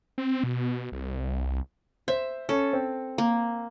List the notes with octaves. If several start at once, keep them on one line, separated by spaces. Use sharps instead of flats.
C4
B2
C2
C5 E5
C#4 A4
C4
A#3